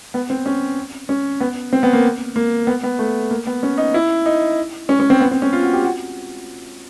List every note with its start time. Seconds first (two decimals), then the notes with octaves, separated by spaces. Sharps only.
0.14 B3
0.30 C4
0.46 C#4
1.09 C#4
1.41 B3
1.73 C4
1.83 B3
1.93 A#3
2.36 A#3
2.67 B3
2.83 B3
2.99 A3
3.31 A#3
3.47 B3
3.63 C#4
3.78 D#4
3.94 E4
4.26 D#4
4.89 C#4
5.00 C#4
5.10 C4
5.21 B3
5.31 C4
5.42 C#4
5.53 F4
5.63 F#4
5.73 G4
5.84 F#4